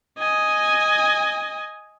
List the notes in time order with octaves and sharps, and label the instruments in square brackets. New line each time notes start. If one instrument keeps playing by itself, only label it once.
[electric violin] D#5 G#5